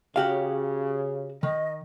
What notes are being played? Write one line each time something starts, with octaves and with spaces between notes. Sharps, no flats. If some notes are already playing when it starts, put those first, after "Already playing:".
C#3 F#4 G4 F5
D#3 D#5